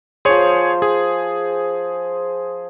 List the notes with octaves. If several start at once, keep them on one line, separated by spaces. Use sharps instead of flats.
F3 G#4 C5 C#5
G#4